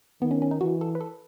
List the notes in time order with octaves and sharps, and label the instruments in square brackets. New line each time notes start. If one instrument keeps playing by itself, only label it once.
[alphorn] D#3 [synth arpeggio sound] B3
[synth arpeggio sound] C#4
C#4
D#4
[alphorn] E3 [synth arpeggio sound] F#4
[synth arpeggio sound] A4
B4
A4